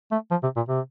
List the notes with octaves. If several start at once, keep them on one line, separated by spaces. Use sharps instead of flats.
A3
F3
C3
A#2
C3